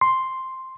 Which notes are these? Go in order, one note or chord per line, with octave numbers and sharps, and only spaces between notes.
C6